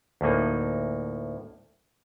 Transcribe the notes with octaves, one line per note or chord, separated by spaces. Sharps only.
D2 A2 A#3 D#4